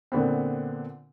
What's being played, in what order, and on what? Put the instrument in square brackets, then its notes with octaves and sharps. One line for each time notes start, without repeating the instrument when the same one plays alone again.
[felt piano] A#2 D3 B3 C4